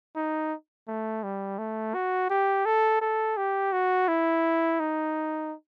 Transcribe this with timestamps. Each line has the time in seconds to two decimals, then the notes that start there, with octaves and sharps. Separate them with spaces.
0.16 D#4
0.88 A3
1.23 G3
1.59 A3
1.94 F#4
2.30 G4
2.66 A4
3.02 A4
3.37 G4
3.73 F#4
4.08 E4
4.80 D#4